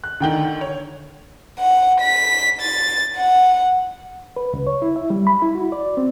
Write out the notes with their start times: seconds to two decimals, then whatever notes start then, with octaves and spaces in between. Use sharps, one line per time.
0.04 F#6
0.20 D2 D3 D#3 G5 G7
0.61 C#5
1.59 F#5
2.00 B6
2.61 A6
3.17 F#5
4.36 B4
4.54 C#2
4.67 C#5
4.82 E4
4.96 E5
5.10 G3
5.27 B5
5.42 E4
5.55 F#4
5.72 D5
5.97 C4